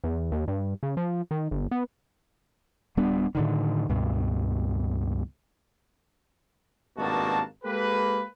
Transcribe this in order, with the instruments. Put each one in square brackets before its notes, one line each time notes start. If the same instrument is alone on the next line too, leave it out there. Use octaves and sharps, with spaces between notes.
[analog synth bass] E2
D#2
G2
C#3
F3
D#3
G1
B3
[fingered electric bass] D1 G3 B3 D4
A2 D3 D#3
C#2 G2 B2
[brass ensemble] G#1 G2 B2 A#3 F#4 A5
G#3 A#3 G4 A4 B4